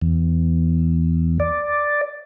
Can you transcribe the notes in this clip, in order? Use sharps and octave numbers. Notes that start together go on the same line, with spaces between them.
E2
D5